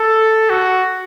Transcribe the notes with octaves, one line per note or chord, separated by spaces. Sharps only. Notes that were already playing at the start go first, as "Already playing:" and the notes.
Already playing: A4
F#4